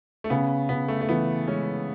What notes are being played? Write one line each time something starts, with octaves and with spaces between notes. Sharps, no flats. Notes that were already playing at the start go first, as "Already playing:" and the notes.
A3
C#3 B3
C#3 B3
A3
A3
E3 B3
G#3 C#4